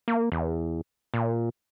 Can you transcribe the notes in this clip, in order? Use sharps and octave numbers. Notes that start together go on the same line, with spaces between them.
A#3
E2
A#2